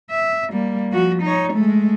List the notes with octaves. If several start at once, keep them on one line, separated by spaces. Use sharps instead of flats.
E5
G3 A#3
F3 F#4
D#4 C#5
G#3 A3